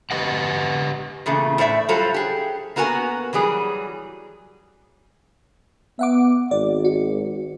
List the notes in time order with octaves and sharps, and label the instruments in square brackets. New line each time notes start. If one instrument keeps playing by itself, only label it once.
[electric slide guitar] G4 B4 D#5 F#5
[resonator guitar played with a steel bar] E2 A#2 C#3 A3
A2 C5 D5 E5
F#3 G3 F4 A4 C5
G4 G#4
A#3 B3 F#4 A#4 G#5
E3 F#3 G3 G#4
[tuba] B3 [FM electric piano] E5 F#5 D6
[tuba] G#1 [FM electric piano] D5
[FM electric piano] F#4